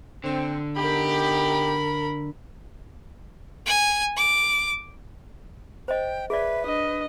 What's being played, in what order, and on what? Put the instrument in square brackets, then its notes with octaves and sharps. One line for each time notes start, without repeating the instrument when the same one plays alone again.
[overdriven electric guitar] D3 [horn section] C4
[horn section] B3 D#4 G4 [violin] A#4 B5
[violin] G#5
D6
[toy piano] C5 D#5 [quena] G5
[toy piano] G#4 D5 [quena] B4 [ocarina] E5
[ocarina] D4 [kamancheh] D#5